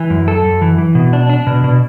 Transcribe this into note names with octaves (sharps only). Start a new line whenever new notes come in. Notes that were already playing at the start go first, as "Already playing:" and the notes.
Already playing: E3
F#2
A4
F#2
E3
E3
B2
D4
D4
B2
B2